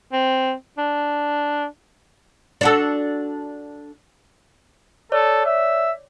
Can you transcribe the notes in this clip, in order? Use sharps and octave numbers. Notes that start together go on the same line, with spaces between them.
C4
D4
D4 F#4 A4
A4 C#5 D5
E5